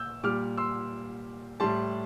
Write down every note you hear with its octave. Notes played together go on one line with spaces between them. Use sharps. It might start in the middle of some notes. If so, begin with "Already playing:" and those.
Already playing: A#2 E6 G6
A#2 G3 D6 F6
C6 E6
A2 G3 A5 C6